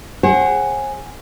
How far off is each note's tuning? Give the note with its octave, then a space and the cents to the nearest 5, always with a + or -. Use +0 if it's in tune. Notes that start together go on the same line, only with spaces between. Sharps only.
G#4 -5 C5 +45 F#5 +20